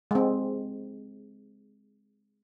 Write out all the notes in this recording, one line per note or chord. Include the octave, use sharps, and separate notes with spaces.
G#3 C4